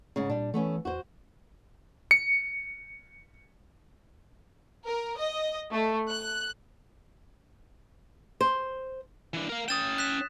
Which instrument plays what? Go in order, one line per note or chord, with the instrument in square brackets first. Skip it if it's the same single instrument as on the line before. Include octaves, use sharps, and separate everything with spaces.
[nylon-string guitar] G#2 C#3
[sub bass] A#2 [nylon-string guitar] G3 D4
[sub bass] E3 [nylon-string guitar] A3 B3 C#4
[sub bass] E2 [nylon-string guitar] F#4 C5
[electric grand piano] C#7
[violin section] A#4
D#5
A3
F#6
[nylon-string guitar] C5
[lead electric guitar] E3 D4
A#4 F5
[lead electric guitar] C#4 G5 [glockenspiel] D#6 A6 E7
[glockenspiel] F#6 B6 E7